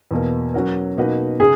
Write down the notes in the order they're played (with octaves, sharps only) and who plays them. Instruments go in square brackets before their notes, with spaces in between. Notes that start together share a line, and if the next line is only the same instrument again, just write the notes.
[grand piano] E2 B2 A#3
F#3 C#4 F#4 A#4
B2 A#3 D#4 F#4 B4
[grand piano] C#3 [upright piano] G#4